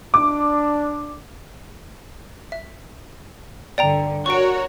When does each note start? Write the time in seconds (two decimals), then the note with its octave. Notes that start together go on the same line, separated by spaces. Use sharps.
0.14 D4 D6
2.52 E5
3.78 G2 D3 D5 G5 A#5
4.26 F#4 A#4 C#5 C#6 D7